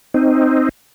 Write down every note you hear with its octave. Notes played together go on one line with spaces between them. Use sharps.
C4 D#4